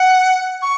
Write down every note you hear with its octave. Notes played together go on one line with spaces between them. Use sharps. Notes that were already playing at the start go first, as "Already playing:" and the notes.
Already playing: F#5
C#6